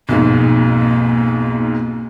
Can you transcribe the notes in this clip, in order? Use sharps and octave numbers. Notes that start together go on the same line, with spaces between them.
B1 F2 G#2 A#3